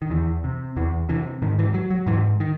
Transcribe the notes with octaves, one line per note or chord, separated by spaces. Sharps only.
D#3
E2 E3
C3
E2 E3
C3 E3
G#2 D#3
E3
F#3
F#3
G#2 E3
D#3